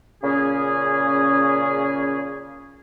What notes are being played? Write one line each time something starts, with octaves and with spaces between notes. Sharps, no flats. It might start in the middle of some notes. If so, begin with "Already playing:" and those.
A#2 C#3 C#4 G#4